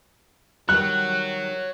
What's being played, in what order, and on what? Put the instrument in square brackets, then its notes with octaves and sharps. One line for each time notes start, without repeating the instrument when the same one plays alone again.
[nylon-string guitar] D#3 G3 [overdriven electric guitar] C#5 F#5 [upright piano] F#6